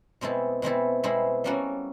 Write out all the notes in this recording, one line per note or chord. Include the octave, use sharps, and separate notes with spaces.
B2 G#3 C4 E4 A4
B2 G#3 C4 E4 A4
B2 G#3 C4 E4 A4
G3 A#3 C#4 F#4 A4